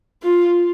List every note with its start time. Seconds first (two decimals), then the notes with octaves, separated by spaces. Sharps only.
0.23 F4